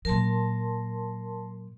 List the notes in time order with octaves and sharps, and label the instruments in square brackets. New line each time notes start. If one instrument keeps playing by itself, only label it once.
[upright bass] A#2 F#3 [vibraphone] A#4 A5 C6